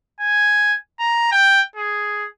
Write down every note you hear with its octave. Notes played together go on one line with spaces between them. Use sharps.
G#5
A#5
G5
G#4